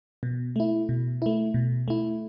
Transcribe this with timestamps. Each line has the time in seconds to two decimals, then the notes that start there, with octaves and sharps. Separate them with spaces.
0.23 B2
0.56 A3 E4
0.89 B2
1.22 A3 E4
1.54 B2
1.88 A3 E4